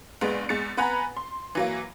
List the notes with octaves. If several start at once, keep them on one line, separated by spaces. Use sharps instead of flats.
A#1 G#3 B3
E2 G#3 A6 C#7
B3 B4 F#5 G#5 A#5 B5
C6
E3 F#3 A#3